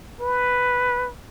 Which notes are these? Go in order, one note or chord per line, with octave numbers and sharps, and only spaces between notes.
B4